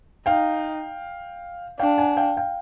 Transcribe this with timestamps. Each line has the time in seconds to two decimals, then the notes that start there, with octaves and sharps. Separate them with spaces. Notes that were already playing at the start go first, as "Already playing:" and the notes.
0.26 D#4 F5 G5
1.79 D4 F5 G5
1.98 F#5 G#5
2.17 F5 G5
2.37 F5 G5